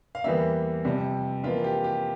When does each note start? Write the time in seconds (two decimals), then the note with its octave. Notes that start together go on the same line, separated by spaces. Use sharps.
0.15 F5
0.24 E2 E3 G3 A#3 E5
0.85 F2 C3 G3
1.44 F2 E3 A#3 F4
1.64 G4
1.84 G4